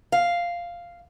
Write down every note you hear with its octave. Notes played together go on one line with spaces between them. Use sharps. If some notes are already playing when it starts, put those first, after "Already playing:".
F5